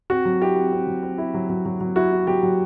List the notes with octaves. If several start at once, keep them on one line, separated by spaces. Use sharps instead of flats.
C4 F#4
F#3
E4 G4
C4
C4
F#3
C4
E4
F#3
F#3
F#3
F#3
E4 F#4
E4
F#3 G4
F#3